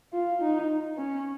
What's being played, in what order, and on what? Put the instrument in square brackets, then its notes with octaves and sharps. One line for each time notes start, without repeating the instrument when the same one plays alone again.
[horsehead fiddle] F4
D#4
C#4